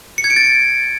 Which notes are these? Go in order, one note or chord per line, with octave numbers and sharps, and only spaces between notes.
C#7
G#6
D7
A6